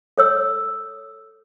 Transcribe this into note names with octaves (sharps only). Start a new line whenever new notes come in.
A4 C#5 E6